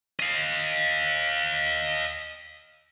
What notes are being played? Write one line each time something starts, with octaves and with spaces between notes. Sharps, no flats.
D#5 F5